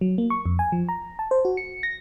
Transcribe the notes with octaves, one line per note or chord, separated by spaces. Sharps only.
F#3
A#3
C#6
F2
G#5
F3
A#5
A5
C5
F#4
C#7
A#6